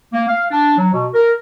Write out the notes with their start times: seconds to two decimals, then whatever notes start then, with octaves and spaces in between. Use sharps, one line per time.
0.13 A#3
0.28 F5
0.51 D4
0.78 F#3
0.93 B2
1.14 A#4